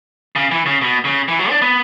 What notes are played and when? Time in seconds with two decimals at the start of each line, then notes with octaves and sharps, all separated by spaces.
0.36 C#3
0.51 E3
0.66 C#3
0.81 B2
1.05 C#3
1.28 E3
1.39 F#3
1.50 D4
1.62 B3